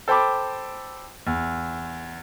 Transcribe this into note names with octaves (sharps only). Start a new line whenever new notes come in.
A4 C5 G5 A5 B5 D6
E2